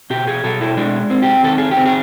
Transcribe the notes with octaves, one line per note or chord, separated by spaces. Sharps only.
B2 G4
G#4
B2 A4
E4
G#3 D4
C4
G4
D#3 A4
G#4
G4
C4
G#4